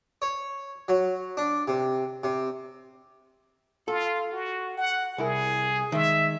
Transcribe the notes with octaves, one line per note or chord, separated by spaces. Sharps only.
C#5
F#3
D4
C3
C3
F4 A4
F#4
F#5
C2 E4 G#4 A#4
D#3 G#3 E5